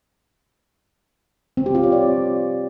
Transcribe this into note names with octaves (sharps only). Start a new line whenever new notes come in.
C4
G4
F4
C#5
D5